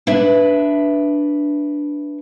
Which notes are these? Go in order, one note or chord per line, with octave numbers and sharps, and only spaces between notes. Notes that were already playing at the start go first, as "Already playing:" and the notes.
D4 B4 E5